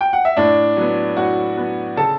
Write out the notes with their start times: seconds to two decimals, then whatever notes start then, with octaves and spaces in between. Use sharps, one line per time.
0.01 G5
0.13 F#5
0.25 E5
0.36 A2 D4 D5
0.76 F#3 B3
1.16 A2 F#4 F#5
1.57 F#3 B3
1.96 C#3 A4 A5